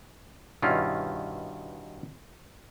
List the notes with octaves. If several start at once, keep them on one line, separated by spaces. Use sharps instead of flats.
G2 B2 D#3 C#4 E4 F4